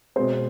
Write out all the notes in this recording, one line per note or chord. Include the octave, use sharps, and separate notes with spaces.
B2 G#3 C4 C5